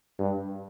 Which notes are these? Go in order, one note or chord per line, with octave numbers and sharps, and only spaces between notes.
G2